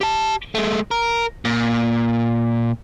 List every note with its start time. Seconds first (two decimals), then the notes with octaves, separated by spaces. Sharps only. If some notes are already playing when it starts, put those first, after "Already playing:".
0.01 G4 A5
0.55 G#3 A3
0.91 A#4
1.45 A#2